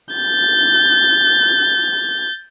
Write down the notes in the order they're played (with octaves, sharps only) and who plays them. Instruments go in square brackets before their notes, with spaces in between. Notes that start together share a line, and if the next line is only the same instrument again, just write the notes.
[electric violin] G6 A6